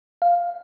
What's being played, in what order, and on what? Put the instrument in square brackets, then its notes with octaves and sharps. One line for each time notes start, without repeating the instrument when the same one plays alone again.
[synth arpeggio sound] F5